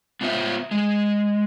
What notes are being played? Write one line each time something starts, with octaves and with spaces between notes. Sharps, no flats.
B3 F4 C5 E5
G#3